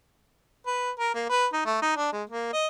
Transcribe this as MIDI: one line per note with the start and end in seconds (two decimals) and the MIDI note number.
0.66 0.90 71
0.99 1.11 70
1.14 1.28 58
1.29 1.46 71
1.53 1.62 63
1.65 1.79 57
1.82 1.95 63
1.96 2.11 62
2.12 2.23 56
2.29 2.50 58
2.53 2.67 75